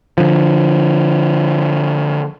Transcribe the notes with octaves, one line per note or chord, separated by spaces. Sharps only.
D3 F3